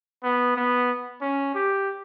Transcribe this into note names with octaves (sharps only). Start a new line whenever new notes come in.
B3
B3
C#4
G4